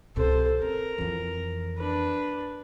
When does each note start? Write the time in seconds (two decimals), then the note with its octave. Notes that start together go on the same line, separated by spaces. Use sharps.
0.16 C2 C3 A4 C5
0.62 C4 A#4
0.98 F2 E3
1.78 D4 B4